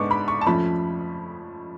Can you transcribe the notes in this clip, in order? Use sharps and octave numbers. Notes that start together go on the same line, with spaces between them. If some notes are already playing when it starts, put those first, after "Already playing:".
Already playing: G#2 G#3 B3 D4 C#6 D6
B5
C#6
A5
F2 F3 A3 C#4 B5